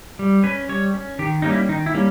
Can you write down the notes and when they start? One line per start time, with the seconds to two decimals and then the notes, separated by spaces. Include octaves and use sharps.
0.19 G3
0.44 C#4 B4
0.69 G3 C#5
0.94 C#4
1.19 D#3 G4
1.42 G3 A#3 C#4 D#4
1.53 E4
1.69 D#3 D#4
1.86 E4
1.94 G3 A#3 C#4